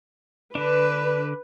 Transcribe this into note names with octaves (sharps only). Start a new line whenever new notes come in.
D3 D4 B4